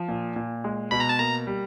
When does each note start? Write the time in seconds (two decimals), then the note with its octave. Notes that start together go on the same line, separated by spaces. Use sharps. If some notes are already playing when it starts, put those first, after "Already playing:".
Already playing: F3
0.08 A#2
0.36 A#2
0.64 G#3
0.91 B2 B5
1.00 A#5
1.09 A5
1.18 A#3 A#5
1.47 G3